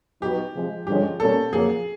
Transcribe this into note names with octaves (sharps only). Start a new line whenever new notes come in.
F#3 B3 D#4 F#4 G4 B4
C3 F3 G#3
G2 D3 F3 G#3 C#4 G4
B2 G3 A#3 C#4 A4
F2 C#3 F#3 A#3 G#4